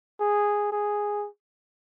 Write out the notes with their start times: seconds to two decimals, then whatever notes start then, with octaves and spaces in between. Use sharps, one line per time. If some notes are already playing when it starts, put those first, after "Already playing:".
0.20 G#4
0.72 G#4